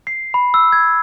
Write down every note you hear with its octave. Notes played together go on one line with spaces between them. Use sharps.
C7
B5
E6
G#6